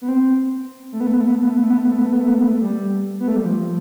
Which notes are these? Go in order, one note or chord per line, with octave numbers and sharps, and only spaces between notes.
B3
C4
A3
B3
A3
B3
A3
B3
A3
B3
A3
B3
A3
B3
A3
B3
A3
B3
A3
B3
A3
B3
A3
B3
A3
G3
B3
A3
G3
F3